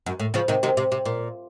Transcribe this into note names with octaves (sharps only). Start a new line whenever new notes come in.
F#2
A2
C#3 F3
C3 D#3
C3 D#3
C3
C3
A#2